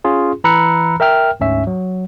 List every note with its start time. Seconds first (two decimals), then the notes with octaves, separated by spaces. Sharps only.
0.04 C#4 F4 G#4
0.44 E3 A#5 B5 E6 F#6 C#7
1.00 A#4 E5 G5 F6
1.40 D2 G#2 C#4 E5
1.67 F#3